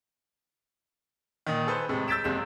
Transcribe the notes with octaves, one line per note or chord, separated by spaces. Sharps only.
A#2 D#3
G#4 A4 B4 C5
A2 C3 G#3
E6 G6 A6 B6 D7 E7
F#1 C3 G#3 E7